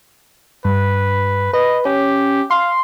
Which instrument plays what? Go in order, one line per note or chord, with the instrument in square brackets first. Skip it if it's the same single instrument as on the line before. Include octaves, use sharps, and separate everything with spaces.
[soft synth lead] G2 [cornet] B4
[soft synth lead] B4 [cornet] D#5
[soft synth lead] C#4 [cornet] G4
[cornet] F5 [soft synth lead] C6